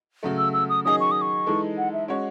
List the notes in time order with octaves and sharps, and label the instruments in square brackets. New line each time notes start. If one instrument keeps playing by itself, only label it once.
[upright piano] C#3 F#3 A3
[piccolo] E6
E6
D#6
[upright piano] D#3 F#3 C#4 G#4 D#5 [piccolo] D#6
[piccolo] C#6
D#6
C#6
[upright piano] E3 G#3 D#4 A4
[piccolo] F#5
E5
[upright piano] G#3 C#4 F#4 C#5